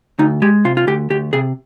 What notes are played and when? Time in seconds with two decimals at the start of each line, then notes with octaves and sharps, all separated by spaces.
0.19 D2 D#4
0.42 G#3 G4
0.65 C3 F4
0.77 F4
0.87 D2 G4
1.10 D2 G4
1.33 C3 G#4